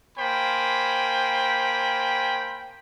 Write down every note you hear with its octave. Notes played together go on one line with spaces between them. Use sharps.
A#3 C5 G5 G#5 B5